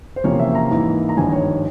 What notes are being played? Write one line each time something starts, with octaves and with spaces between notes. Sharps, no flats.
C5
E2 C3 F3 A#3 C#4 C#5
E5
A#5
G#2 E3 A#3 E4
A#5
G#1 G2 F3 G#5
C#5
C#5